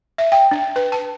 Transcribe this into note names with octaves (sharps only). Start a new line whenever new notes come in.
E5
G5
D4
B4
A5